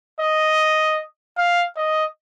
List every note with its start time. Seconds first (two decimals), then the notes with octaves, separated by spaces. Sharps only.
0.20 D#5
1.38 F5
1.77 D#5